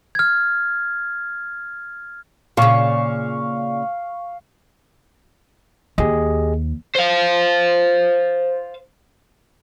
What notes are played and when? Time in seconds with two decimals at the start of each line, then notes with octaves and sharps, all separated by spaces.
0.15 F6 G#6
2.57 A#2 C#3 F5 C#6
5.98 D#2 G4 G#4 D#5
6.96 C5 F5